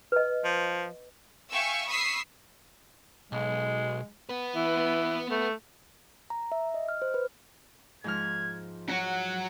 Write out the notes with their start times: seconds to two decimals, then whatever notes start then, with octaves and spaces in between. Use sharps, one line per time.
0.12 B4 D#5
0.44 F3
1.51 E5 F5 G5 G#5 C#6 E6
1.88 B5 C#6 D#6 E6 B6 C7
3.32 B1 G#3
4.29 B3 B4
4.55 E3
5.31 A3
6.30 A#5
6.52 E5
6.74 D#5
6.89 F6
7.02 C5
7.14 B4
8.04 G#2 F3 F6 G#6
8.89 F#4 C#5 F#5